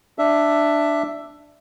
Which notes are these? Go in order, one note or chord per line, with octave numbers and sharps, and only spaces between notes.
D4 E5